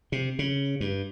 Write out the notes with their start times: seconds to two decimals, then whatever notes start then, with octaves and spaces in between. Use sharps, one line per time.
0.12 C3
0.39 C#3
0.80 G2